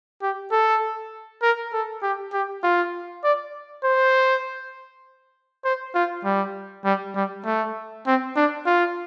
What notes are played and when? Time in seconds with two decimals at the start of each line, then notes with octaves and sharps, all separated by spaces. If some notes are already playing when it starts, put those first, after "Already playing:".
0.22 G4
0.52 A4
1.42 A#4
1.73 A4
2.03 G4
2.33 G4
2.64 F4
3.24 D5
3.84 C5
5.65 C5
5.95 F4
6.24 G3
6.85 G3
7.15 G3
7.45 A3
8.06 C4
8.36 D4
8.66 F4